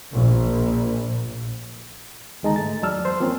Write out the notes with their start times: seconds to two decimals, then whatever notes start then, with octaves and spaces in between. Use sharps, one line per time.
0.14 A#1
2.43 D2 D#3 G#3 D#4 A5 A#5
2.56 G#2 A3 A6
2.82 E2 F#3 D5 A5 E6 F6
3.05 C5 C6
3.20 F3 A#3 C4 C#4